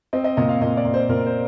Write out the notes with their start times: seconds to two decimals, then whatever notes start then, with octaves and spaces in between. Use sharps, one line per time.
0.13 C4 D#5
0.24 D#5
0.37 A#2 D#5
0.49 F5
0.61 A#2 D#5
0.77 D5
0.85 A#2
0.94 C5
1.09 A#2 A#4
1.26 C5